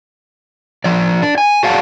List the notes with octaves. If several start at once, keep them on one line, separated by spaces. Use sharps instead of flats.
F3 D5
D4
G#5
F#4 G#4 D5 F5 F#5 A5